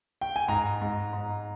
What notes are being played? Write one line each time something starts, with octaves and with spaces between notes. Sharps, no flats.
G5
G#5
G#2 A#5
G#2
G#2